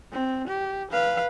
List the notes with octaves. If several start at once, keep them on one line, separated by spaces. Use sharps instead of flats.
C4
G4
B4 F5